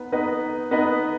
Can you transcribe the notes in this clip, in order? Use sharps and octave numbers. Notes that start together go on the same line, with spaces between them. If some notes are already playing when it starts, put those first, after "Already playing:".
Already playing: B3 D#4 B4
B3 D#4 B4 D#5
B3 D#4 B4 D#5